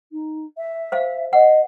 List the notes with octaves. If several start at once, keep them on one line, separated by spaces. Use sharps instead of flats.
D#4
E5
C5 F5
D#5 F#5